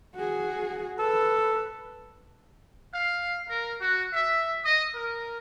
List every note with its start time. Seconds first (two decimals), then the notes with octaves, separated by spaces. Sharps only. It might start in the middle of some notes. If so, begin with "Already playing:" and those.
0.15 F#4 G#4
0.99 A4 B4
2.94 F5
3.49 A#4
3.80 F#4
4.14 E5
4.65 D#5
4.95 A#4